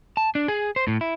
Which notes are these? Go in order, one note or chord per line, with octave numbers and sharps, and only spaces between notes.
A5
D4
G#4
C5
A2
E4